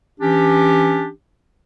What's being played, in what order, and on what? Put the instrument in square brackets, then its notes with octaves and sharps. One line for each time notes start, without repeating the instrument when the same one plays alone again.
[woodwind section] E3 C#4 D4 G4